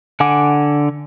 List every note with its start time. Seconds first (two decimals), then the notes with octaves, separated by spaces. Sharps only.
0.20 D3 F#5 G#5 D6